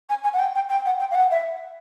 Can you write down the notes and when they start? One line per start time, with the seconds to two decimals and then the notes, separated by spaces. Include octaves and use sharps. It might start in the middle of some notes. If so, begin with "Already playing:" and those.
0.09 G#5
0.23 G#5
0.33 F#5
0.39 G5
0.55 G5
0.69 G5
0.85 F#5
0.99 G5
1.11 F5
1.14 F#5
1.31 E5